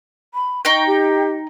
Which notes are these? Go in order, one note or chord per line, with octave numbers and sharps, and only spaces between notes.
B5
D#4 G5 C#6
G4